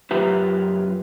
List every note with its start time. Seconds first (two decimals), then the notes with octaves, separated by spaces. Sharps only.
0.11 F#2 F4 G4 B4 E5 A#5